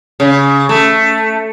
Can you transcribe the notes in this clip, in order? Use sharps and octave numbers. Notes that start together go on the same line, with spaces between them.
C#3
A3